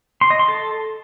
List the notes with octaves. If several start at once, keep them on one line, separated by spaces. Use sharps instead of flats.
C6
D#5
C6
A4